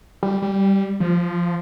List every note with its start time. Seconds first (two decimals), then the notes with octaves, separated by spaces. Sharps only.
0.23 G3
0.42 G3
1.00 F3